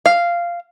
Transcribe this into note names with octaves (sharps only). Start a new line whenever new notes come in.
F5